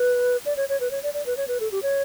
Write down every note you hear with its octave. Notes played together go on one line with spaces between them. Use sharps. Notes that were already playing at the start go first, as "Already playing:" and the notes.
Already playing: B4
D5
C#5
C#5
B4
C#5
D5
D5
B4
C#5
B4
A4
G4
C#5